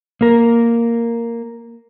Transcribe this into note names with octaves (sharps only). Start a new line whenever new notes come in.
A#3 A#4